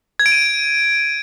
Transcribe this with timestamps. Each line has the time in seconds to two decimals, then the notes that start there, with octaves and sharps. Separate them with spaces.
0.19 G#6
0.26 D7
0.32 D#7